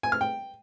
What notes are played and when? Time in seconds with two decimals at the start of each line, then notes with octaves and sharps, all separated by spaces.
0.03 G#5
0.12 F6
0.21 G5